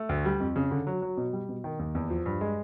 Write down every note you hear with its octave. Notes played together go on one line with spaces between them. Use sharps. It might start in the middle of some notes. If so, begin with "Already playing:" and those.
Already playing: A3
D2
G3
F2
C#3
D3
F#3
F#3
B2
G3
B2
D#3
D#2
E2
F3
G2
G#3